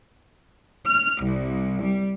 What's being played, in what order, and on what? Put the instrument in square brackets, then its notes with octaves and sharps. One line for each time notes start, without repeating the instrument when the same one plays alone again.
[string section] F6
C2
G3